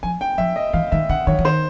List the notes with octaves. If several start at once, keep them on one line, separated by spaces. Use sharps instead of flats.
F3 G#5
G5
F3 E5
D#5
E3 F5
D#3 E5
D3 F#5
D#3 C#5
E3
D#3 C5